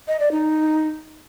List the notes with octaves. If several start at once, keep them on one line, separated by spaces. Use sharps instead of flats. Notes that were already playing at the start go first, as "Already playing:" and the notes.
D#5
D5
D#4